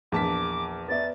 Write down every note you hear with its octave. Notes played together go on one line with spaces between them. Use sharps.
A#1 E2 A5 D6 B6
B3 D5 E5 A6